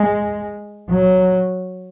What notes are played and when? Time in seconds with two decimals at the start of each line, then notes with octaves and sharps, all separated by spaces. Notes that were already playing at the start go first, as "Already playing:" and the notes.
Already playing: G#3
0.89 F#3